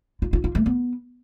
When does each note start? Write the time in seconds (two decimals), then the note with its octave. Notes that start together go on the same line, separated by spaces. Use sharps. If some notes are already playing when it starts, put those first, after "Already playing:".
0.22 F4
0.33 F4
0.44 F4
0.55 A3
0.66 B3